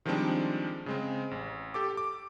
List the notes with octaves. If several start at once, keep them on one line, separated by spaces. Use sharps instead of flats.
D#3 F3 G3 G#3 C4 D4
C#3 G#3 C4
A1
G4 A4 D6
D6